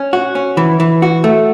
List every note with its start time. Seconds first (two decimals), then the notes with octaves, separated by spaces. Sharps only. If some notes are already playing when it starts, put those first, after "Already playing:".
Already playing: C#4
0.13 F#4
0.35 C#4
0.57 E3
0.80 E3
1.02 F#4
1.24 A3